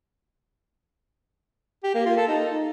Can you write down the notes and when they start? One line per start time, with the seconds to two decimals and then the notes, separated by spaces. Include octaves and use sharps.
1.83 G4
1.95 A#3
2.06 F4
2.17 A4
2.28 D#4